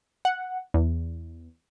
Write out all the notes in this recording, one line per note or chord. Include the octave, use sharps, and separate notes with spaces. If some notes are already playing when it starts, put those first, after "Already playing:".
F#5
E2